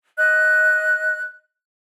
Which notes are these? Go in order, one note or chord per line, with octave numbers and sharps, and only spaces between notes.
D#5 F#6